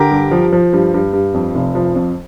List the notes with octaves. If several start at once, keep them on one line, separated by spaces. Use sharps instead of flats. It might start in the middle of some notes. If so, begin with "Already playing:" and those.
Already playing: D3 G4 A#4
G2
F3
F3
G2
G2
G2
F2
F1
F3
F2